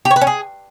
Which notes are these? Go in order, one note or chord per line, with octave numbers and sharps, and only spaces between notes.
G4
C#5
B4
C#4
G#4